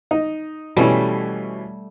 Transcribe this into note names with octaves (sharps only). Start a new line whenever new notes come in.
D#4
B2 E3 G3 A3 C#4